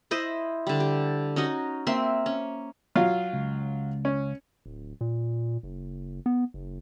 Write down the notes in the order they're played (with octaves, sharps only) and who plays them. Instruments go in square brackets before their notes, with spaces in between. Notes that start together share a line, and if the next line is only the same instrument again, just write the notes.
[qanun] E4 C5 D#5
D3 G3
G4
C#4 D#4 F#4 D#5
A#3 C4 E5 C6
C#4
[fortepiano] F#3 F4 F5
[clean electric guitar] C#2
[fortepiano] C#4
[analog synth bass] D1
A#2
F#1
B3
F#1